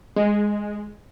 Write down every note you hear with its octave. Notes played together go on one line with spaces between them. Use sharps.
G#3